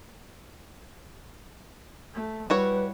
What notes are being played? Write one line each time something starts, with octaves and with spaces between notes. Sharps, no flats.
A3
G3 E4 F#4 B4 C#5